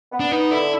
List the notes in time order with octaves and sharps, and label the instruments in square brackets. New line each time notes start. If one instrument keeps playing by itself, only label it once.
[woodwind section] B3
[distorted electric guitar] D4
[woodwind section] B3 [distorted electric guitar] D#4
[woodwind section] D3 [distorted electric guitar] E4